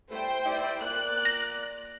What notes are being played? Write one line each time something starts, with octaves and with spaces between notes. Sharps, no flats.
G3 A3 E4 C5 G5
G3 E4 D5
A#2 A#3 D5 F#6
A#6